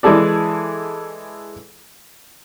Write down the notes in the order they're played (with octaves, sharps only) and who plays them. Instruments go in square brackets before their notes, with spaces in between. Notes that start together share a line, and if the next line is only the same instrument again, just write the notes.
[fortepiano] E3 G#3 E4 G#4 A4 D5